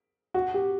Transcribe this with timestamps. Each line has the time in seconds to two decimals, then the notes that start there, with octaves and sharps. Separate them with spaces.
0.34 F#4
0.54 G4